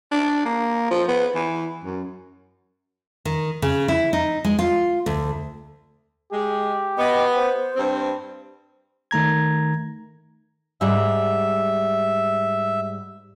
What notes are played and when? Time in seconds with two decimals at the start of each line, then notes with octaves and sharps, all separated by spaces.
0.12 D4
0.45 A#3
0.91 F3
1.08 B3
1.35 E3
1.84 F#2
3.25 D#3
3.62 C#3
3.88 E4
4.13 D#4
4.45 G#3
4.59 F4
5.06 D2
6.32 G#3 G4
6.98 B3 D#5
7.35 C5
7.75 G2 C4
9.11 D#3 A3 A#5 G#6
10.81 G#2 G3 E5